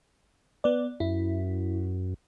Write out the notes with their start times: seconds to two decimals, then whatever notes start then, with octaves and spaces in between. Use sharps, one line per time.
0.64 B3 D5
1.00 F#2 E4